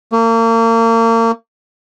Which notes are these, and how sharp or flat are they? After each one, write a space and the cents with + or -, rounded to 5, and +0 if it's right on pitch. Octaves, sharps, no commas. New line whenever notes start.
A#3 -35